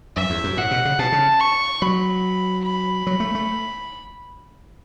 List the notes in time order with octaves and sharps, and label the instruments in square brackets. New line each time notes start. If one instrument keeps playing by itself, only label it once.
[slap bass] F#2 [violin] E5
[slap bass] E2
F#2
[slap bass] A2 [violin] F#5
[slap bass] B2
C#3
[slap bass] B2 [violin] A5
[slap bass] C#3
[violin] C#6
[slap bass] F#3 [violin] B5
[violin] B5
[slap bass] F#3
A3
A3